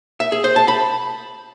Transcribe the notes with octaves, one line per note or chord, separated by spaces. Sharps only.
E5
G#4
C5
A5
B5